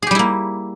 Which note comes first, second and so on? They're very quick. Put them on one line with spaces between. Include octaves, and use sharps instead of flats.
G#4 G4 G3 E4 A#3